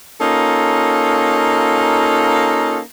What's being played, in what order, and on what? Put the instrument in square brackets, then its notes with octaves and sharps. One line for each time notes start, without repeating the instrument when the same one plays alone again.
[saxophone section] A#3 C#4 D#4 F4 A4